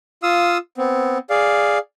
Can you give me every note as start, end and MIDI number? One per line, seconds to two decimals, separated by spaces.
0.23 0.58 65
0.23 0.58 77
0.23 0.58 87
0.23 0.58 88
0.78 1.18 59
0.78 1.18 60
1.30 1.78 68
1.30 1.78 74
1.30 1.78 77